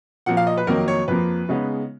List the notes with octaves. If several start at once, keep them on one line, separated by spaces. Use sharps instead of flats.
A#2 F3 A#3 F#5
F5
D#5
B4
F2 D#3 F#3 A#3 D#4 A#4
C#5
F2 F3 A#3 B4
C#3 G#3 B3 D#4